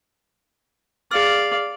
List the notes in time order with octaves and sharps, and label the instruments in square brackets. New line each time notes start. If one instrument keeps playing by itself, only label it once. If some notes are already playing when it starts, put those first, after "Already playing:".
[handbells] G#4 F6 [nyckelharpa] D5 F5